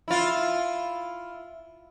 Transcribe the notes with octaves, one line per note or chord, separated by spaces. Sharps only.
E4 F4